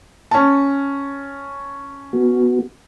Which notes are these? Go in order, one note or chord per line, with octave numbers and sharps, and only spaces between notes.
C#4 A5
B3 F#4